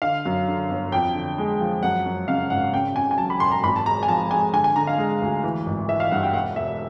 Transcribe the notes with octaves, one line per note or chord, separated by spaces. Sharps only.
D3 F5
F#2
D3
G1
F2 G5
D3
G#3
F3
F#2 F#5
F#2
C#3 F5
G#1 F#5
C#3 G5
C#3 G#5
G#5
F#3 A5
B5
E1 C6
A#5
G#1 B5
A5
G#3 A#5
G#5
F3 A5
G#3 G#5
D3 G#5
G#5
D3 A#5
F5
G#3
D2
E3
G#1
E3 E5
F5
G2 F#5
G5
E1 F#5
E1 E5